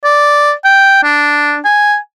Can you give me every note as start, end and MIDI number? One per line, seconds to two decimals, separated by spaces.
0.04 0.52 74
0.65 1.03 79
1.03 1.59 62
1.65 1.96 80